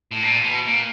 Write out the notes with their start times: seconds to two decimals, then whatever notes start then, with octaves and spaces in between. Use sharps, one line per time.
0.11 A2
0.23 A#2
0.44 B2
0.66 A#2